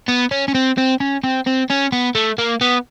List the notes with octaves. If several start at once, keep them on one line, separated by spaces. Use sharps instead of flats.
B3
C#4
C#4
C4
C4
C#4
C4
C4
C#4
B3
A3
A#3
B3